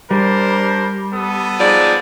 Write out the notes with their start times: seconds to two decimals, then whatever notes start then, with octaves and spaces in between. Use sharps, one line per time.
0.11 G3 D4 A#4 C5
1.13 B3 A4 D#6
1.59 G#2 F3 D5